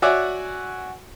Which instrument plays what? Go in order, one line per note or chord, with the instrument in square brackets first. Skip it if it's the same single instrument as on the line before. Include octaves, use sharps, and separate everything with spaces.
[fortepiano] F#4 C#5 D5 E5 F#5 G#5